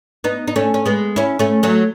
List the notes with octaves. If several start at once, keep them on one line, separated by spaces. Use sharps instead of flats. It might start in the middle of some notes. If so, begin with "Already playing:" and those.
B3 D#4
D#4
A3 C#4
C#4
G#3 B3
C#4 E4
A3 C#4
F#3 A3